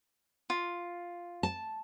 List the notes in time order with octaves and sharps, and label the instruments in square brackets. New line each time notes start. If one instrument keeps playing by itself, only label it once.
[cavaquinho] F4
[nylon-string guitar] A5